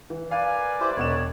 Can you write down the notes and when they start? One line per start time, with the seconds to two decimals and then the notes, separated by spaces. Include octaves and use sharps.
0.10 E3
0.31 A#4 B4 D5 F5 G#5
0.80 E4 G4 C5
0.96 E1 B2 C#5 E7